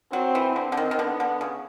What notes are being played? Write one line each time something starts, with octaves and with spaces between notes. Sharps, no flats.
F#3 C4
E3
D3 C4
D3
D#3
D#3
D3 B3
D3
C#3